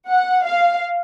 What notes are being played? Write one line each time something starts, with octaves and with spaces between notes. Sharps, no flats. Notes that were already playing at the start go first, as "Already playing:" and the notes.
F#5
F5